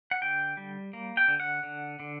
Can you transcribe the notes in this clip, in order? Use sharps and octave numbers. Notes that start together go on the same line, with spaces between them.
F#5
D3 G5
G3
A#3
G5
D3
F#5
D3
D3